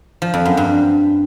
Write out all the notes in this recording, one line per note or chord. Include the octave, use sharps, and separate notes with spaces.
F3
F2
F#2
G2